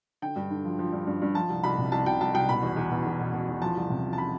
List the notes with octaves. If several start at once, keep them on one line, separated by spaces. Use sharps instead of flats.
D3 G5
G2
D3
F3
F3
G2
G2
G2
F3 A5
C2
C2 B5
C3
C2 A5
C2 G5
C2 A5
C2 G5
B2 B5
E2
E2
B2
E2
B2
B2
E2
F3 A5
C2
C3
F3
A5
B5